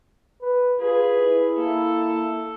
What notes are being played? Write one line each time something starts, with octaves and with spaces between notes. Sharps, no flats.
B4
F4 G#4 B4
E4
A#3 A4